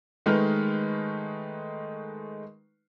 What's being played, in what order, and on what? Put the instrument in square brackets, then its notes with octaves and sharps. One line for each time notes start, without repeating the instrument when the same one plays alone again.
[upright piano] D#3 G#3 A3 D#4 B4 F6